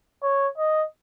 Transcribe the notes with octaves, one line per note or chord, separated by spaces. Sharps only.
C#5
D#5